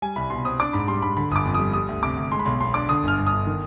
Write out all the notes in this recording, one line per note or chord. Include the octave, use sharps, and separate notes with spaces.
G3 G#5
C2 B5
B2 C6
C4 D#6
D4 D6
G#2 B5
G3 C6
G#2 B5
D3 B5
G1 D6 D#6
F2
G3 D#6
G3 D#6
D2
C3 D6
D2
G#3 C6
B5
B1 C6
B2 C6
D4 D6
D3 D#6
G1 F6
G2
D#6
G1
D#3